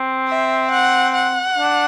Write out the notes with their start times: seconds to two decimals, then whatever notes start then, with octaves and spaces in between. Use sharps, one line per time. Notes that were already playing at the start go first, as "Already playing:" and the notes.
Already playing: C4
0.28 E5
0.71 F#5
1.14 F#5
1.58 D4